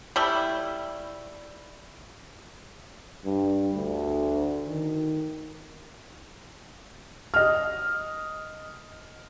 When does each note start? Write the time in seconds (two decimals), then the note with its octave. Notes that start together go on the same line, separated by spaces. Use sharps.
0.16 G3 A3 E4
3.25 G2
3.74 D2
4.68 D#3
7.34 D#5 F6